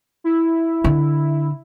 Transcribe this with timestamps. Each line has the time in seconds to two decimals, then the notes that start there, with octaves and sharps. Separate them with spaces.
0.24 E4
0.84 D3